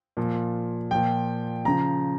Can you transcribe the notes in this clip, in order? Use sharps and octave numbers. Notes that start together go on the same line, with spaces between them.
A#2 F3
A#2 F3 G5
C#3 F3 A#5